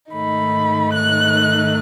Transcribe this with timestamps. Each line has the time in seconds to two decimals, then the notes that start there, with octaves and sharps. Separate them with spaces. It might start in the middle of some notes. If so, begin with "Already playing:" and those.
0.12 G#2 D#3 A3 D#4 B5
0.93 F#6